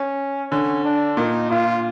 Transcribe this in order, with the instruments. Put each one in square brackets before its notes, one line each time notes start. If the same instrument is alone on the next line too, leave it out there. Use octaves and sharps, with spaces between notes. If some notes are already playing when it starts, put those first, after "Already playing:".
Already playing: [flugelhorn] C#4
[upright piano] D3 [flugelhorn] C#4
[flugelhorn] D4
[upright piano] A#2 [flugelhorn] D#4
[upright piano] A#2 [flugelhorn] F4